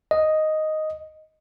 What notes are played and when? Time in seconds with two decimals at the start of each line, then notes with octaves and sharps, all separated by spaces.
0.11 D#5